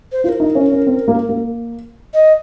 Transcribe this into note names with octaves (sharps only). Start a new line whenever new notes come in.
C5
F4 C5
A#4
D#4
C#4
C#4
C4
A#3
A#3
D#5